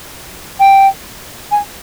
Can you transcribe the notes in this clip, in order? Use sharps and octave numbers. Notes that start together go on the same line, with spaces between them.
G5
G#5